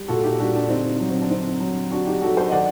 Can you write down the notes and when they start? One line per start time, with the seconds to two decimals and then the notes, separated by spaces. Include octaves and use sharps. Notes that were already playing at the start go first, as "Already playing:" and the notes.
Already playing: G3
0.08 A#2 F#4 A4
0.23 D#4 G4
0.39 G3 D4 F#4
0.55 D4
0.69 D3 C4 D#4
1.00 F#3
1.10 C4
1.21 D4
1.30 D3 C4 D#4
1.60 F#3
1.91 D3 D4 F#4
2.06 D#4 G4
2.22 F#3 F#4 A4
2.36 A4 C5
2.48 D#5
2.51 D#3 D5 F#5